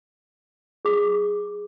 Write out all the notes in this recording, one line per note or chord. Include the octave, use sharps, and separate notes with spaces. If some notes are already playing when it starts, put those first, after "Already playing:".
G#4 D6